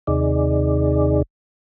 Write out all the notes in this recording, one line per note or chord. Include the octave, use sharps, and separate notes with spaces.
D#2 C3 D#4 G#4 D5